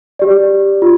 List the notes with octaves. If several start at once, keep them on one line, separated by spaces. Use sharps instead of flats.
G4 D5
F4